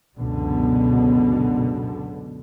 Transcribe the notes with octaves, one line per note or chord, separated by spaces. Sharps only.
C#2 F#2 B2 D3 B3